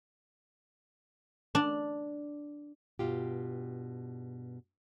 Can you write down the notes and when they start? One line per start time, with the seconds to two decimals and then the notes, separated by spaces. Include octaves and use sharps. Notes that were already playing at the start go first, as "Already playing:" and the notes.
1.55 D4
2.99 G2 B2 F4 G4